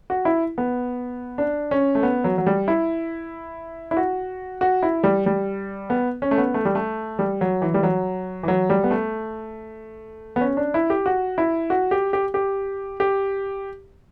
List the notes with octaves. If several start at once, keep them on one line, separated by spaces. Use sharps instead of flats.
F#4
E4
B3
D4
C#4
A3
B3
F#3
F#3
G3
E4
E4
F#4
F#4
E4
G3
G3
B3
C#4
A3
B3
A3
G3
A3
G3
F#3
E3
G3
F#3
E3
F#3
G3
B3
A3
B3
C#4
D4
E4
G4
F#4
E4
F#4
G4
G4
G4
G4